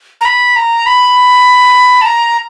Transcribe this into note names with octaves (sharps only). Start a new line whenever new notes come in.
A#5
B5
A#5
B5
A5
A#5